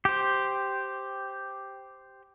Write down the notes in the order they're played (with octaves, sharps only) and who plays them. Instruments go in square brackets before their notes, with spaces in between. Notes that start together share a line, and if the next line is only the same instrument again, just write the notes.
[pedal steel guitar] G4 C5